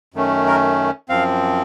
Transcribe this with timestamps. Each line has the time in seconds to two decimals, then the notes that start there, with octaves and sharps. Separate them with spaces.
0.14 F#2 D#3 A3 C#4
0.47 A#4
1.09 F#2 F3 C4 F5